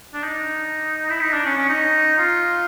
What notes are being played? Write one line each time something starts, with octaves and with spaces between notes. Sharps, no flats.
D4
D#4
E4
D#4
D4
C#4
C#4
D#4
F4